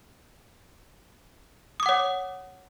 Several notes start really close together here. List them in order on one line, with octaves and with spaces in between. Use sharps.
D#6 D6 F#5 C#5